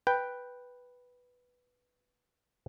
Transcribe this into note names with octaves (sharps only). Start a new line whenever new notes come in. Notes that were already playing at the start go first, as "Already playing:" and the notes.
B4 G5